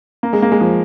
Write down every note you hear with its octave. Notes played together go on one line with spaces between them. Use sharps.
A#3
G#3
A#3
G#3
F3